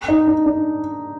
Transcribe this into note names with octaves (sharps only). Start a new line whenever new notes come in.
D#4
D4
D4